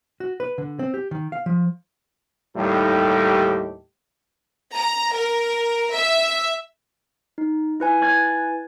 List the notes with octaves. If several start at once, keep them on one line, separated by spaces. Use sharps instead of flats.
F#4
B4
D3
C4
G4
D#3
F5
F3
D#2 A2 G3 D#4 G4 A4
A#5
A#4
E5
D#4
E4 B4 G#5
F#6 G#6 A6